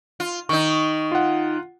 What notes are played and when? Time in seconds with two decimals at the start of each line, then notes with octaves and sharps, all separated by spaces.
0.20 F4
0.49 D#3 D#4 C#6
1.12 F4 F#5